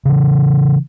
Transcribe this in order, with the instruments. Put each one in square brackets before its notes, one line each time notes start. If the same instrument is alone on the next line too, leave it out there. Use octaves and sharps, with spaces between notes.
[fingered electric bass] C#3 E3